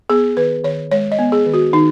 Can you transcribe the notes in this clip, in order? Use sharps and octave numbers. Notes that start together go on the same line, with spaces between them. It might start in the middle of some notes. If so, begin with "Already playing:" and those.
B3 G#4
D#3 B4
D#3 C#5
G#3 C#5
D#5
B3
G#4
D#3
F#4
D#3 D#4